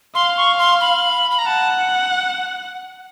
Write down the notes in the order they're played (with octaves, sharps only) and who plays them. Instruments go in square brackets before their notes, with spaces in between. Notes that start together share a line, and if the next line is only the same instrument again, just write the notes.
[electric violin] F5 [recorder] C6
[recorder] C#6
C6
B5
B5
A#5
[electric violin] F#5 [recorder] A5